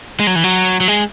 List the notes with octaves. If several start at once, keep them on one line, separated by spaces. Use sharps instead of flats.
G#3
F#3
E3
F#3
F#3
G#3